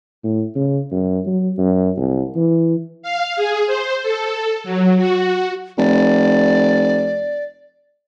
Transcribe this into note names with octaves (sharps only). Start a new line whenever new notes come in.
A2
C#3
F#2
F#3
F#2
C2
E3
F5
G#4
C5
A4
F#3
F#4
F1 D5